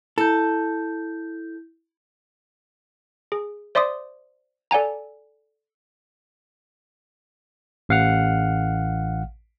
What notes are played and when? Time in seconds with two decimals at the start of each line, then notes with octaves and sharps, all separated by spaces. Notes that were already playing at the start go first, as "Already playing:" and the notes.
0.18 E4 A4 G6
3.32 G#4
3.75 C5 D5 E5 C6 D6 D#6
4.71 A4 D5 F#5 G#5 A#5
7.89 A1 F5 F#5 F6